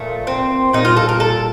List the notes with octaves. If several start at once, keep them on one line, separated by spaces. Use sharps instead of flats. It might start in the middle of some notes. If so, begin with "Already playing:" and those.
Already playing: A#2 F3 A3
C4
A#2 G3 D#4
F4
A4
A#4
A4